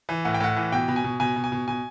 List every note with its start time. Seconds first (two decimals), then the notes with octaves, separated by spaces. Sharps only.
0.09 E3
0.25 A2 F#5
0.34 G5
0.40 A2 F#5
0.56 E3
0.72 B2 G5
0.88 B2
0.96 G#5
1.04 B2
1.20 B2 G#5
1.36 B2
1.44 G#5
1.52 B2
1.68 B2 G#5